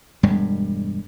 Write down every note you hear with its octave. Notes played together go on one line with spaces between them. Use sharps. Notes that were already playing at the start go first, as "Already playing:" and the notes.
E1 G2 G3 G#3